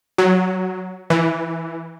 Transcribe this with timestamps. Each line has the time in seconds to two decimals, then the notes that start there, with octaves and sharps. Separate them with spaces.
0.18 F#3
1.10 E3